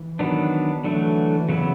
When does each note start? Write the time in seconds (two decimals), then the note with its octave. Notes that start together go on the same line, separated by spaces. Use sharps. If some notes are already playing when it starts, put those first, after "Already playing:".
Already playing: E3
0.19 D#3 F#3 B3 D4
0.84 D3 E3 F#3 A3
1.49 C#3 F#3 B3 E4